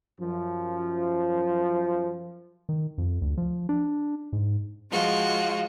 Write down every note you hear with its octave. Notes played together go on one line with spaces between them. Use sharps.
F#2 F3
D#3
F2
D2
F3
D4
G#2
F3 G#3 F4 F#4